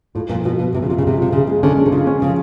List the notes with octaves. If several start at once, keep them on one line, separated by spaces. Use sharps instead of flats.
A2 F4
A#2 F3
B2 F3
B2 F4
C3 F3
C#3
C3 F4
C#3
C3 G#3
C3 F4
C#3 G#3
G#3
D3 C#4
G#3
C3
C#3 F4
C#4
C#3 F3